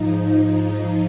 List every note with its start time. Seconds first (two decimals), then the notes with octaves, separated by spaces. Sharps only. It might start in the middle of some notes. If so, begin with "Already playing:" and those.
Already playing: G#2 F3 D#4